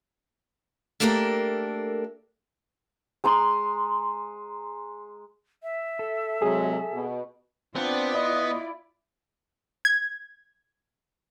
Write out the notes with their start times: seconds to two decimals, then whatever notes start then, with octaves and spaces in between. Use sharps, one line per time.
1.00 A3 A#3 D4 G4 A4 A#4
3.24 G#3 A#5 C6
5.63 E5
5.99 A4
6.42 C3 F#3 G#3 G#4
6.93 B2
7.76 B3 C4 D4 F4 D5
8.14 E4 D#5
9.85 G#6